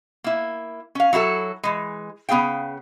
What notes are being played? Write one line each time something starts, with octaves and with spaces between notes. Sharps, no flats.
A#3 E4
C#4 F5
F#3 E4 F#4 A4
E3 G#3
C#3 B3 G#4 F5 G5